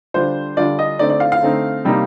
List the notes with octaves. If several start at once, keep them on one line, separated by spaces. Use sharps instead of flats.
D3 G3 D4 F4 C5
D3 G3 D4 F4 D5
D#5
D3 A3 C4 D#4 D5
D5
F5
F5
D3 A3 C4 D#4
C3 G3 A#3 D#4